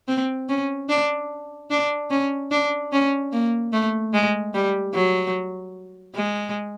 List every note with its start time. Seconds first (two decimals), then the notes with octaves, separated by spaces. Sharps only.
0.08 C4
0.49 C#4
0.89 D4
1.71 D4
2.11 C#4
2.51 D4
2.92 C#4
3.33 A#3
3.73 A3
4.14 G#3
4.54 G3
4.94 F#3
6.16 G#3